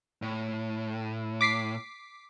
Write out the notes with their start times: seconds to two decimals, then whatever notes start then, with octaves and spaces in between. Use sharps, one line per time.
0.22 A2
1.41 D6 B6 C7